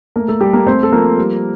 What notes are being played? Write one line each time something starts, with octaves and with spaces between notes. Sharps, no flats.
A3 A#3 A#4
A3 A4
G3 A3 G4
A#3 A#4
A3 C4 C5
A4
F3 A#3 A#4
G3